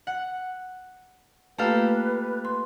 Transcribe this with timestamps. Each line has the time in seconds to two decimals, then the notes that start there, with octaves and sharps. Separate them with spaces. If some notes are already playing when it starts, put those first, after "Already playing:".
0.07 F#5
1.59 A3 A#3 F4 G4 A4 B4 F5
2.45 C6